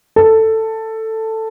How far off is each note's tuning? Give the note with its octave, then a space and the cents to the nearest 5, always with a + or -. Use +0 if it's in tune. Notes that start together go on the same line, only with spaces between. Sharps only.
A4 +10